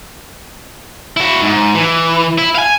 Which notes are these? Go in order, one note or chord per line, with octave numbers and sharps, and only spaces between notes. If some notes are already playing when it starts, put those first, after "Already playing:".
E4 F#4
G#2
E3
E4
F5 G#5